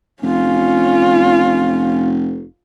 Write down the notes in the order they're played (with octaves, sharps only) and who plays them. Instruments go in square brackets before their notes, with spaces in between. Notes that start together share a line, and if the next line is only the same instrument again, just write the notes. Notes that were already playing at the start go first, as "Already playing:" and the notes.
[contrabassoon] F1 [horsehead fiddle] C#4 F4